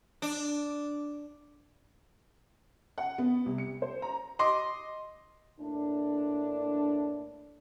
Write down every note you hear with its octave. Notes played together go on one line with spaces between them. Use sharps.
D4
F#5
B3
C2
C#7
C5
A#5
D#5 C6 D6
A2 A#3 D4